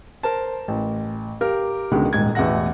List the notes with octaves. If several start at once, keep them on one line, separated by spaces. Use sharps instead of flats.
A#4 C5 A5
A1
G4 A#4 F5
C#2 B2 D3 G#3 D#4 F#4
D#1 G#2 G#6
A1 E2 B2 E5 F#5 A#6